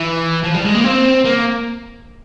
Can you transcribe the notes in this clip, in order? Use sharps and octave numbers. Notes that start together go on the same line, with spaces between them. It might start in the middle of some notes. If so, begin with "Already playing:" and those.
Already playing: E3
F3
G3
G#3
A#3
C4
A#3